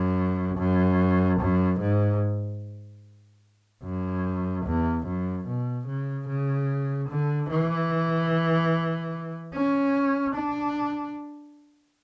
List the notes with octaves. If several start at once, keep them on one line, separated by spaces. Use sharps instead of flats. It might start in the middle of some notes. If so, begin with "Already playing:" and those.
Already playing: F#2
F#2
F#2
G#2
F#2
E2
F#2
B2
C#3
C#3
D3
E3
C#4
D4